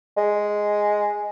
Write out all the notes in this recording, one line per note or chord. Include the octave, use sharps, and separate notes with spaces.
G#3